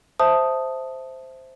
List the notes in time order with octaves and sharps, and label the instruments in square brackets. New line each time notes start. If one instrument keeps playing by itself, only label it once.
[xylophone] C5 E5 A5 D#6